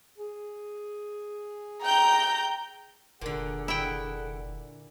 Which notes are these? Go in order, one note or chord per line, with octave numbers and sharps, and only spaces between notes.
G#4
G5 A#5 G6
F1 A#2 D3 G#4 A4 F#5
E4 G5